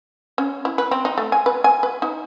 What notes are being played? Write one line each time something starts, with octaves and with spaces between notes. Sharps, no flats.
C#4
E4
B4
C4
D#4
A3
G#5
B4
G#5
B4
D#4